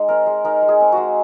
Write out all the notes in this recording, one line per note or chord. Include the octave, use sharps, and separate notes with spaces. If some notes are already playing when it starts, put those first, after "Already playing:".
Already playing: G#3 D#4
C4 A#4
G#3
D#4 A#4
G#3
G#4
C4
G#3 F#4